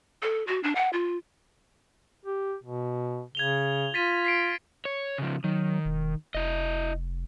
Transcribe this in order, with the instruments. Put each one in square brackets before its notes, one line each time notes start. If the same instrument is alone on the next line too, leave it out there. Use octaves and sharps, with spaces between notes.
[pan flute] A4
F#4
D4
F#5
F4
[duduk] G4
B2
[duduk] C#3 [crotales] G#6 F7 G7
[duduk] F4 [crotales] A6 B6 D#7
[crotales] B6 C7 D7
[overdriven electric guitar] C#5
C#3 F3
[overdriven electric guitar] D#3 [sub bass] F#3
[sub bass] E1
[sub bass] F1 [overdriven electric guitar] E4 D#5